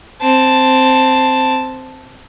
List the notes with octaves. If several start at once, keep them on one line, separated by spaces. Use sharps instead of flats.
C4 A5